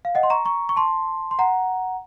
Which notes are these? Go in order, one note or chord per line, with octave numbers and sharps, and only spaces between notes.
F5
D#5 F#5
C6
A#5 C#6
A#5 C#6
C#6
A5 C6
C6
F#5 A#5